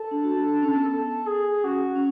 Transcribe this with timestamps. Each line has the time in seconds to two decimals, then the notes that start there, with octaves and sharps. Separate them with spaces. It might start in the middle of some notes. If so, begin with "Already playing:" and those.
Already playing: A4
0.11 D4
0.24 F#4
0.37 D4
0.50 D4
0.62 C#4
0.75 B3
0.88 A4
1.26 G#4
1.64 C#4 F#4
1.95 C#4